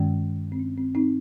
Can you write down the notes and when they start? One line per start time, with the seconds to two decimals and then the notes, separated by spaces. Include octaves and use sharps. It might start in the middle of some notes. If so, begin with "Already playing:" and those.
Already playing: G2 D#3 G#3 C#4
0.52 C4
0.59 C#4
0.78 C4
0.95 C4 D#4